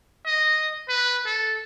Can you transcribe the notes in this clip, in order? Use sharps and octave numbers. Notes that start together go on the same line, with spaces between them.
D#5
B4
A4